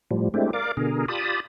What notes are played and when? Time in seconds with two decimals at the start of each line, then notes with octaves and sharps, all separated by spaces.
0.11 A2 F3 G3
0.34 G#3 A3 C4 D4 E4 G4
0.53 A#4 D5 F5 D6
0.77 B2 D3 G#4 A#4
1.08 F4 G4 D5 A5 B5 D#6